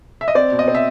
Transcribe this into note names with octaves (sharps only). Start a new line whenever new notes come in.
E5
D#5
C4 D5
B2
D#5
C4
E5